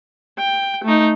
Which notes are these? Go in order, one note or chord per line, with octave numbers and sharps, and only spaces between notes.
G5
A3 D#4